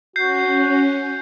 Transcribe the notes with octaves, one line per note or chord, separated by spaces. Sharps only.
C#4 F#4 G6 C7